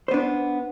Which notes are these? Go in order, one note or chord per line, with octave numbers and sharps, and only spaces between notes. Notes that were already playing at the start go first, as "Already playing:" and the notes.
B3 D4 C5